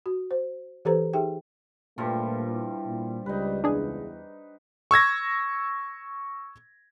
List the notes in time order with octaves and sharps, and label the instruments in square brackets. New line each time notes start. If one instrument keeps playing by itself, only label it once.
[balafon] F#4
C5
E3 G4 A4 B4 C5 A#5
D#4 G4 G#4 E5 G5
[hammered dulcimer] G2 F3 G3 [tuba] A#2 [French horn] A3
[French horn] E4
[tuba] A#2
[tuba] C#2 [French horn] G3 [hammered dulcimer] D#4 B4
[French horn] E2 [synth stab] D4 G#4
[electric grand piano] C#6 E6 G#6 A#6